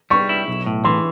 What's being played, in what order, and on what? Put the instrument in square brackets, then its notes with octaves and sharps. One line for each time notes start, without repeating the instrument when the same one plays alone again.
[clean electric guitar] G3 [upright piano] C#6
[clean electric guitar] E4
B1
A2
[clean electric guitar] E3 [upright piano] C6